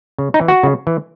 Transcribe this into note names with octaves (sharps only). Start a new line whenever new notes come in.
C#3
D#4
E3
F#4
C#3
E3